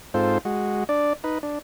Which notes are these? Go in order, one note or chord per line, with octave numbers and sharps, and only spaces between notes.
G#2 C4 F4 A4 C5
G#3 F#4
D4 D5
D#4 B4
D4